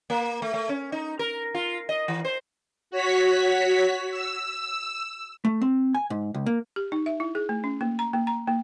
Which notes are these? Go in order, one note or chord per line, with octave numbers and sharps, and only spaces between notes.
A#3
A3
A3
C#4
D#4
A#4
F4
D#5
E3
C5
F#4 C#5 B6
E6
A3
C4
G#5
G#2
C#2
A#3
G4
D#4
E5
E4
G#4
A3
C#4
A#3
A#5
A#3
A#5
A#3